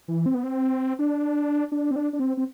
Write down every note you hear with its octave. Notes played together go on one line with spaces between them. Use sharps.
E3
C4
B3
C4
D4
D4
C4
D4
D4
C4
C4